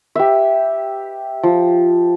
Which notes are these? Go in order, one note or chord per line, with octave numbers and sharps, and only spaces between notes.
G4 B4 E5
F3